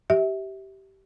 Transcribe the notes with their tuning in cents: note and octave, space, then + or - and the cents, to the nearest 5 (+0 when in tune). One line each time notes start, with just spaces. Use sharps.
G4 -20 E5 -25